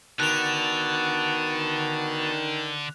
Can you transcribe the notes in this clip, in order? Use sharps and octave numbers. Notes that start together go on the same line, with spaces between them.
D3 D#3 B3 F#4 A5 F#6 F7